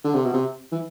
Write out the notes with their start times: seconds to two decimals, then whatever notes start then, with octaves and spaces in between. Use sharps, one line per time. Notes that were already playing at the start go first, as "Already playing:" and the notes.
0.04 D3
0.14 C3
0.25 B2
0.33 C3
0.72 E3